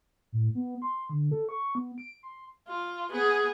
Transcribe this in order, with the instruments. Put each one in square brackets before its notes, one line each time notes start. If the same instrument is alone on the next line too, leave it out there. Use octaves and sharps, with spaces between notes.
[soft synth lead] A2
B3
C6
D3
A4
C#6
B3
D7
C6
[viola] F4
B3 G#4